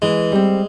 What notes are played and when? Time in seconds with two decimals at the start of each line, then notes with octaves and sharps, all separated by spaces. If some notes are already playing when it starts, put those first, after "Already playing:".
0.02 E3 G#3
0.32 G3 C4